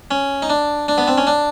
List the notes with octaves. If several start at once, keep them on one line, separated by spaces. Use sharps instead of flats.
C#4
D#4
D4
D4
B3
C4
C#4
D4